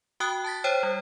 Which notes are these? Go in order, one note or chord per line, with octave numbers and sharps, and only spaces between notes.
F#4 G5 D#6 F#6
A5 A6 B6
C5 C#5 G5
G3